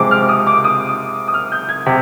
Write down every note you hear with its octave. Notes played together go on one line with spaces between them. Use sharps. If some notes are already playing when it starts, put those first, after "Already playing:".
Already playing: C3 F3 G#3 D6
F6
D6
D#6
D6
D#6
D#6
F6
G6
G#6
C3 B6